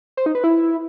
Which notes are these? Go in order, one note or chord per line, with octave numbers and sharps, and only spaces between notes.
C5
D#4
B4
E4